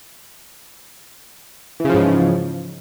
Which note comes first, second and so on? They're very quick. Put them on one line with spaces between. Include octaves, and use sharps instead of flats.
E3 C#3 F3 G#2